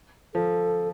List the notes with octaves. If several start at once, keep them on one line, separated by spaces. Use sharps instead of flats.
F3 A4